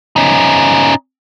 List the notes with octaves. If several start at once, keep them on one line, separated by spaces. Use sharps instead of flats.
C#4 D#4